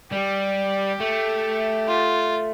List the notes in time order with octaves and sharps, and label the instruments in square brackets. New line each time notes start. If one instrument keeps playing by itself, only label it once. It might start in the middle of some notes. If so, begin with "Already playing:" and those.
[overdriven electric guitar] G3 [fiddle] G4
[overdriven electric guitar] A3
[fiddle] F4